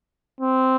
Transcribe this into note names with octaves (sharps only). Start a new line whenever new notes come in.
C4